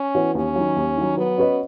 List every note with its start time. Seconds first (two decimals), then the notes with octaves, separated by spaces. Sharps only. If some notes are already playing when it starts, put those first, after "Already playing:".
Already playing: C#4
0.15 E3 B3 F#4 C#5
0.35 D#2 C#4
0.56 D#3 F#3
0.76 D#2
0.97 D#3 F#3
1.17 F#3 B3
1.38 C#4 F#4 B4 D#5